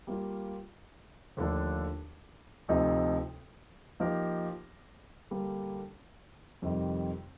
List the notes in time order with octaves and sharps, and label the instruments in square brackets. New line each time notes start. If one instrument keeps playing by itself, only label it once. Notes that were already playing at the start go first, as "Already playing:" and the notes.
[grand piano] G3 A#3 F4
D#2 D3 F3 A3 D4
D2 C3 F3 A3 D#4
F3 A#3 D#4 G4 A#4
D3 G3 A#3
F2 C3 D#3 G3